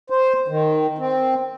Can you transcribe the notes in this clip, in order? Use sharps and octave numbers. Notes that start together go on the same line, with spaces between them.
C5
D#3
C4